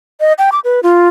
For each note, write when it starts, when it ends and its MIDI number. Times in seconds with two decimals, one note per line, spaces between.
0.20 0.33 75
0.38 0.50 79
0.52 0.60 86
0.64 0.80 71
0.83 1.09 65